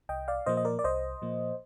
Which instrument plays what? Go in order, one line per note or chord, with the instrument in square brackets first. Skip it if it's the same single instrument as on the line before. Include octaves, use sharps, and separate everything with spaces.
[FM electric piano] C2 D#5 G5
D5 F5
A#2 F3 A#3 C5 D#5
D#5
A#4 D5
D5
C2 C5 D#5
A#2 F3 A#3